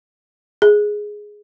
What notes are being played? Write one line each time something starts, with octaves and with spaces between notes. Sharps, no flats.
G#4